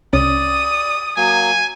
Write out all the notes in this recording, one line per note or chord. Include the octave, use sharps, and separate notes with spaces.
C2 C#4 D5 D#6
F#3 A#3 G#5